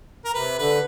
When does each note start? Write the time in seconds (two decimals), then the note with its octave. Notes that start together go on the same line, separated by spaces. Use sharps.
0.25 A#4
0.34 C3 B4
0.58 D3 B4